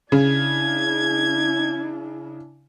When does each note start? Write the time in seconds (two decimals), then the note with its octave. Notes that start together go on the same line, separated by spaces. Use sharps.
0.12 C#3 D4 E4 G#6